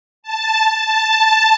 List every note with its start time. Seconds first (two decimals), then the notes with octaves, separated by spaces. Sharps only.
0.23 A5
0.81 A5